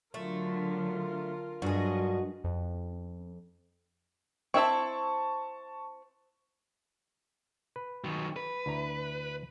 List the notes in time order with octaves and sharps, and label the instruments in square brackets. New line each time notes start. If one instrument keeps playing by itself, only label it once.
[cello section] D3 F#3 [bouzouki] A3 [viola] F4 A#4
[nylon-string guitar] G2 [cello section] F#3 D#5 [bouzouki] F#4 G#4
[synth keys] F2
[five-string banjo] C4 E4 E5 [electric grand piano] A5 C#6
[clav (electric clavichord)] B4
[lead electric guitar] D#3 F#3
B4
[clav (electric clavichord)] D2 E4 A#5